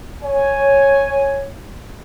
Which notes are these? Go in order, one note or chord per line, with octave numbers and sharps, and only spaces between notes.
C#5 G#5